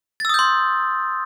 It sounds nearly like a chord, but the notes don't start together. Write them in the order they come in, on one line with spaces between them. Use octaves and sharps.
A6 E6 D#6 G6 C6